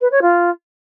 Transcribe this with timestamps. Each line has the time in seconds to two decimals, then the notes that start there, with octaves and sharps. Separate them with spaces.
0.01 B4
0.12 C#5
0.22 F4